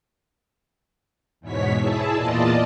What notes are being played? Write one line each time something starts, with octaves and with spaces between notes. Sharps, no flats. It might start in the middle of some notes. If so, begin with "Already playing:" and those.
E2 G#2 B2 C#5 B6
E4 G#4 E5 A5
E2 A#2 F4 D5 D#5 A5